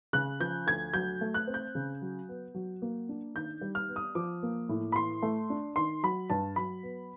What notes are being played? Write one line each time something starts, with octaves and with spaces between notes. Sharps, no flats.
C#3 F#6
F3 G6
D2 G#6
F#3 G6
A3
F#6
C4
G6
C#3
F#3
B3
F#3
A#3
D4
D#3 G6
G3
F6
B3
D#6
F3 D6
A#3
A2
B5
E3 C6
A3
D4
D#3 C6
F#3 B5
G2 A5
F#3 B5
B3